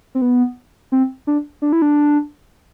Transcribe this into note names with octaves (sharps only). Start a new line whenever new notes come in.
C4
B3
C4
D4
D4
E4
D4